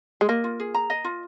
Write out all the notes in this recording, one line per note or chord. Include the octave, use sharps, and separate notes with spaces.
G#3
A#3 D#5
F4
G#4
A#5
D#5
F4